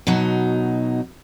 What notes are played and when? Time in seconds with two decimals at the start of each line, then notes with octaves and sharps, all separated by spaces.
0.07 B2 F#3 D#4